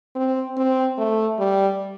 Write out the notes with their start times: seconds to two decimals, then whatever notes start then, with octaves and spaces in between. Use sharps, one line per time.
0.16 C4
0.57 C4
0.98 A3
1.39 G3